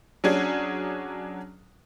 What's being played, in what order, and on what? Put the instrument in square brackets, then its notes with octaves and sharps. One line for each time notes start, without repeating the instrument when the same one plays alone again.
[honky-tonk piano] F#3 C#4 D4 G#4